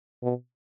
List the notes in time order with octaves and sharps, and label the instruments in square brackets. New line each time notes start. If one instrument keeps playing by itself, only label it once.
[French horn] B2